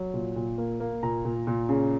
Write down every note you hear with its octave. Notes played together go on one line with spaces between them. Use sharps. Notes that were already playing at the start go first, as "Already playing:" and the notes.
Already playing: F#3
A#2
A#2
A#3
A#3
A#2 A#5
A#2
A#2
C#3